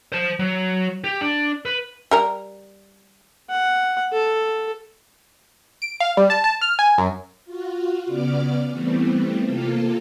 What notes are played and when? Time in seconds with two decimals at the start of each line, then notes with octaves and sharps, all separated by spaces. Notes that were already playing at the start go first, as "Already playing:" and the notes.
0.12 C5 A5
0.39 F#3
1.04 G4
1.21 D4
1.65 B4
2.11 G3 A#4 A#5
3.50 F#5
4.13 A4
5.82 D7
6.00 F5
6.17 G3
6.30 A5
6.44 A5
6.61 F6
6.79 G#5
6.98 F#2
7.45 F4 F#4
8.06 C#3 B3 D5 D6 F6
8.70 E3 G3 A3 B3 C4
9.42 C3 A#3 F4 A4